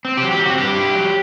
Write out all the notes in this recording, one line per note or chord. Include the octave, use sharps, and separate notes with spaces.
C4
F#3 G4
G4
C4
F#4
G2 G4
E4
F#3